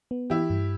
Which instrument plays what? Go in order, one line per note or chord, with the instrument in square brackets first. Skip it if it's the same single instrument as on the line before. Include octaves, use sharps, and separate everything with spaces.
[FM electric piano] B3
[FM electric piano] E3 [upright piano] E4 G4
[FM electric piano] G2